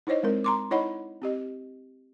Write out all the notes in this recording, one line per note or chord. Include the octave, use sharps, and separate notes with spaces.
D#4 E4 C5 C#5 D#5
G#3 C4 A#4
A#5 C6 D6
D#4 E4 C#5 D#5 F#5 B5
C4 G4 D#5